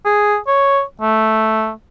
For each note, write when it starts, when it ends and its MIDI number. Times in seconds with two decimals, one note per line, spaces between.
0.05 0.37 68
0.47 0.82 73
1.01 1.72 57